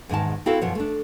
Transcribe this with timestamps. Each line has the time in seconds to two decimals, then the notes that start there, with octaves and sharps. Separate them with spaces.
0.09 E2 G#2 D#3 A5
0.46 C4 E4 F#4 A4 F5
0.62 F#2 B2 F3 C#5
0.75 A3 D4